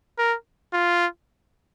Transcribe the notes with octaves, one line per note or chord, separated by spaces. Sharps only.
A#4
F4